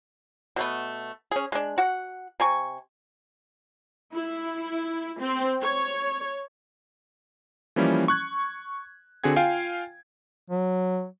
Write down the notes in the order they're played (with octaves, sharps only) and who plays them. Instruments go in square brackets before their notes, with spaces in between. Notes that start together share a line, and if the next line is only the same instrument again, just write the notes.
[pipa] B2 A3 B3
C#4 G#4
G#3 D4
F#4 F#5
C3 G#5 C#6
[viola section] E4
C4
C#5
[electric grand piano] E3 F3 G3 A#3 C#4 E4
C#6 F#6 G#6
D3 C4 F#4 G#4 F#5 G#6
F4 F5 G5 G#5
[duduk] F#3